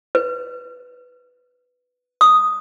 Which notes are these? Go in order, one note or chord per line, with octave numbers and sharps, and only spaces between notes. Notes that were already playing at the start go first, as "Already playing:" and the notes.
B4
D#6